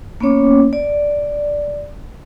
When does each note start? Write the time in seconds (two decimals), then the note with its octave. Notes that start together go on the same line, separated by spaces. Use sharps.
0.20 A#3 B3 C#4 C#5 D6
0.73 D5